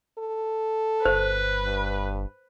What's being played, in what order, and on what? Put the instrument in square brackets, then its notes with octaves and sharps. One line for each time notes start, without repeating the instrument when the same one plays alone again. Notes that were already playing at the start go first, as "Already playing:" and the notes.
[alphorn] A4
[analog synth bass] G1 [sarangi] B4 [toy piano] C5
[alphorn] G2